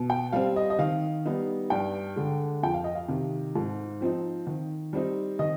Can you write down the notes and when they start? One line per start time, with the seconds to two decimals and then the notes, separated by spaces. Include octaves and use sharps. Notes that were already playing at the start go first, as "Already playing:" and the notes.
Already playing: B2
0.10 G5
0.33 G3 C4 F5
0.56 D#5
0.70 D#5
0.79 D#3 F5
1.26 G3 B3 D#4
1.70 G2 G5
2.16 D3 G#3
2.63 F2 G5
2.74 F5
2.84 D#5
2.95 F5
3.08 C3 D#3
3.56 G#2
4.00 F3 C4 D#4
4.47 D#3
4.93 G3 C4 D#4
5.39 D#3 D#5